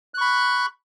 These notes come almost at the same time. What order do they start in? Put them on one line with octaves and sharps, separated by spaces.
F#6 C#6 B5